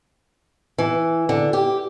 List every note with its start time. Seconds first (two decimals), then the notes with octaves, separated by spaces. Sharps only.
0.78 E3
1.29 D3
1.53 G4